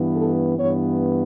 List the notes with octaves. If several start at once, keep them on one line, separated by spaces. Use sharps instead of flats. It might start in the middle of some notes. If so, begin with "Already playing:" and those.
Already playing: G2 E3 B3
A4
G2 E3 B3 C#5